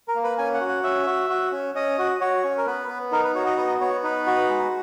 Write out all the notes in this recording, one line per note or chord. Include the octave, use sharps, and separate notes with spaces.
A#4
A#3
B4
C#4 G#5
F#5
F#4
F#5
C#4 E5
F#4
F#4
C#4
C#4 D#5
F#4
F#4 C#5
C#4
A#4
B3 B4
B3
D#4 A#4
B4
F#4 C#5
D#5
B3 D#5
B3 C#5
D#4 B4
F#4
G#3